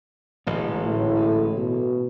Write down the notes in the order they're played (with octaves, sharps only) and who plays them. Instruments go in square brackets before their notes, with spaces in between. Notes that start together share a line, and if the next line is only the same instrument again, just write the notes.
[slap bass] D1 A1 G#2
[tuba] A2
B2